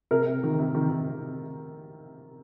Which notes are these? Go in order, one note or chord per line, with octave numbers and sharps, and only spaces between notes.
C3 A#4
C3
D#3
C3
D#3
D#3
C3